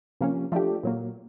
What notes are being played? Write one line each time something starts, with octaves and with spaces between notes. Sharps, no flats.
C3 F3 A#3 C#4
F3 A3 D4 G4
A#2 F#3 A#3